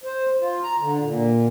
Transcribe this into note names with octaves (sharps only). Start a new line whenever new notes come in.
C5
F4
A#5
D3
A#2